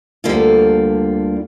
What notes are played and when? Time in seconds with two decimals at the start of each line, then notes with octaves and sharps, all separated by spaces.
0.24 D2 D3 G3 A#3 F4